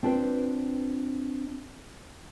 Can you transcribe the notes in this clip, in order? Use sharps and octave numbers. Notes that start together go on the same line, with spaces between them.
C4 D4 F4 B4 G5